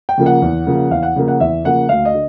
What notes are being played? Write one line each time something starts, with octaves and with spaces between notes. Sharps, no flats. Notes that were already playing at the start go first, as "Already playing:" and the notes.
G5
C#3 F3 A#3
F#5
E2
C#3 F3 A#3
E2 F5
F#5
C#3 F3 A#3
F#5
E2 E5
C#3 F3 A#3 F#5
D2 F5
D#5
D3